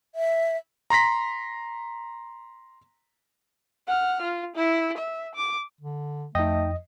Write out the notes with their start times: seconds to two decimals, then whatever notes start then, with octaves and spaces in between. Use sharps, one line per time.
0.15 E5
0.90 A#5 C6 A#6 B6
3.88 F#5 F6
4.22 F4
4.56 E4
4.98 E5
5.35 D6
5.81 D3
6.35 F2 A3 D#4 D#5 G5